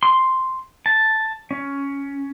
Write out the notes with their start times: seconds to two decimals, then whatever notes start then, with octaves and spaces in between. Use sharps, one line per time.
0.03 C6
0.86 A5
1.51 C#4